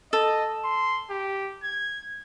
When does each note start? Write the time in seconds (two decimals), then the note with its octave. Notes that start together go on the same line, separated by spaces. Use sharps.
0.13 A4 D#5
0.64 C6
1.10 G4
1.63 G#6